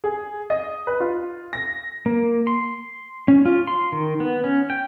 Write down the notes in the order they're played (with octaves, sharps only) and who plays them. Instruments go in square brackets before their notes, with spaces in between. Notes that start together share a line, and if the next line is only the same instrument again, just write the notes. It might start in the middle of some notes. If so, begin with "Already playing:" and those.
[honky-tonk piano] G#4
D#5
B4
F4
A#6
[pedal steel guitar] A#3
C6
C#4
F4
C6
D#3
B3
C#4
G5